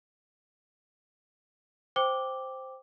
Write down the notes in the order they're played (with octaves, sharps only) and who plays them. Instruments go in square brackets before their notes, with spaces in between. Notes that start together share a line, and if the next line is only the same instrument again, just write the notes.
[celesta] C5 G5 D6 G7